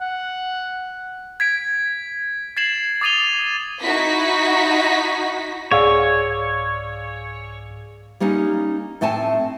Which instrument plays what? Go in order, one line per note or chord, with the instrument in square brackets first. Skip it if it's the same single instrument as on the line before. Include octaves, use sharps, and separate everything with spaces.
[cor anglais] F#5
[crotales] G#6 B6 D7
G#6 A6 C7 E7 F#7
D6 D#6 A6 D#7 F7 G7
[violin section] D#4 E4 F#4 B6
[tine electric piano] C2 G#2 E6 [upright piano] G#4 D5 F5 [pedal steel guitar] C#5
[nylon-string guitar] G3 A#3 C#4 D#4
A2 A3 C4 G#5 A5